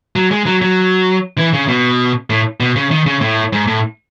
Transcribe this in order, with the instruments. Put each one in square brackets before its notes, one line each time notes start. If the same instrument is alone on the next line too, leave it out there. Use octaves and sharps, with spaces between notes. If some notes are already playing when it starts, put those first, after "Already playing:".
[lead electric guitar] F#3
G#3
F#3
F#3
E3
C#3
B2
A2
B2
C#3
D#3
C#3
A2
G#2
A2